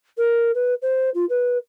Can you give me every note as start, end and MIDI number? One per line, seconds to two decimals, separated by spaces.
0.18 0.51 70
0.55 0.74 71
0.82 1.10 72
1.14 1.25 65
1.29 1.58 71